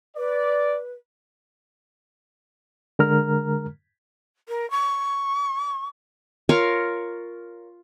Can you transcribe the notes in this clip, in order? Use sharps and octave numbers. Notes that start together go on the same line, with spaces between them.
B4 D5
D3 G#3 A#4 A#5 F6
A#4
C#6
F4 A#4 C#5 F5